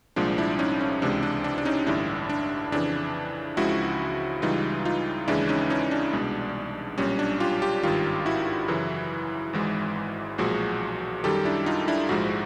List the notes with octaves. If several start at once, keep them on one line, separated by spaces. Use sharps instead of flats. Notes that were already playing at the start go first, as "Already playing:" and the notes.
C2 A#2 F3 G#3 D4
D4 E4
C#4 D#4
C#4
C#2 C3 E3 G#3 D4
D4
D4
D4
C#4 D#4
A1 G2 D3 D4 E4
D4
F2 C#3 E3 D4
C#2 C#3 F3 G#3 E4 F#4
C#2 C#3 E3 G3 D#4 F4
D#4 F4
D#2 C#3 E3 G#3 D4 E4
C#4 D#4
C#4 D#4
D4
C2 B2 G#3
B1 A#2 G3 C#4
D4
F4 G4
F4 G4
G#1 G2 D#3 F4 G4
E4 F#4
F#2 C#3 E3
G#1 G#2 E3 G#3
B1 A#2 F3 G#3 F#4 G#4
F#2 D#3 G3 G4 A4
D4 E4
D#4 F4
D4 E4
A#1 G#2 F3 G#3 E4 F#4